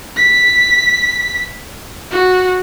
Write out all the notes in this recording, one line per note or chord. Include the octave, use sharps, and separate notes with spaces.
B6
F#4